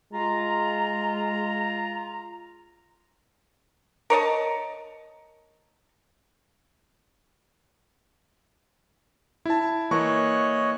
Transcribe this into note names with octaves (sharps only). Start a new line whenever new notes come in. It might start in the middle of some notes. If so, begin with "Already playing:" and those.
G#3 F4 A#5
A#4 C#5 D#5 A5
E4 A5
E3 A#3 C#5 D#5 C#6 F#6